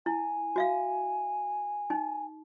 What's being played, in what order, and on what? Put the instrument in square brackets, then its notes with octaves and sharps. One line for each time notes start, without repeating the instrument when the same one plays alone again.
[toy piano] E4 [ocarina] G#5
[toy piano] F#4 E5 F5
D#4